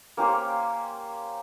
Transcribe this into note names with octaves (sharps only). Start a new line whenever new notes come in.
A#3 C#4 G4 C5